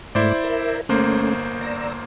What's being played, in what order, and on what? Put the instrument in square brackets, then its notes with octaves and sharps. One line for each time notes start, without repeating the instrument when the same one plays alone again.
[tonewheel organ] G#2 A3 D6 [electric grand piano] E4 C5 D5
[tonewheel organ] A#4 E5
[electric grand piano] G1 A#3 C5 [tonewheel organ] A3 C#4
[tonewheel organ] D5 A#5 E6